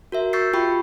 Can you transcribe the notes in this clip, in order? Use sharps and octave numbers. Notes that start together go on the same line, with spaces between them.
F#4 A#4 E5
C#6 E6 G6 A6 B6 C7
F4 G4 G5 B5 C#6